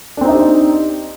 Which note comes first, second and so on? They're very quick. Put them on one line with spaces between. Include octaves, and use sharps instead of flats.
D4 C4 D#4 D#5 G4